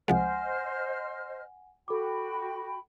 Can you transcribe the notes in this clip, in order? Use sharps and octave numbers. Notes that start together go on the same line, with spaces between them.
C2 F3 G#3 C5 D#5 F#5 G#5 F6
F#4 A4 G5 B5 D6